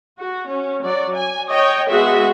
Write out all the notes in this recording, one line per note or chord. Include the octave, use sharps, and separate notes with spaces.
F#4
C#4
F#3 D5
G#5
C#5 D#5 G5
G#3 B3 F#4 G#4 E5